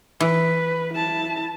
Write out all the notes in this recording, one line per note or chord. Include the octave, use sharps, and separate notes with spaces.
E3 B4
E4 A5